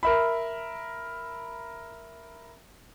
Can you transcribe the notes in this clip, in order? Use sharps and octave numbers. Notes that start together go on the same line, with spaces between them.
A#4 E5 B5